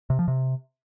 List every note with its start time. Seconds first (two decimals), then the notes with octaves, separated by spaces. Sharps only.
0.10 C3
0.19 F3
0.28 C3